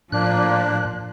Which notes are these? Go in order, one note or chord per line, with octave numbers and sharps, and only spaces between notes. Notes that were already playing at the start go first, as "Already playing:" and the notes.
A2 F3 A#3 D4 F#6